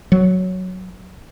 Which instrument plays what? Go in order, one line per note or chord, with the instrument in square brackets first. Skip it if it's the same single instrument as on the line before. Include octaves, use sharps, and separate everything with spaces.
[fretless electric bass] F#3